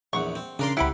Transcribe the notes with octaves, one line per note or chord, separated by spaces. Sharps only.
A#1 E2 F#5 C#6
C4
C#3 D4 A#4 D5 C6
C#2 C3 E4 G4 F#5 B5